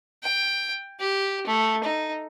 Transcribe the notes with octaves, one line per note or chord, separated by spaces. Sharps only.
G5
G4
A3
D#4